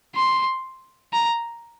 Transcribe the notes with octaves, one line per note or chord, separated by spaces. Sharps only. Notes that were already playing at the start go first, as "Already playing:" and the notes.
C6
A#5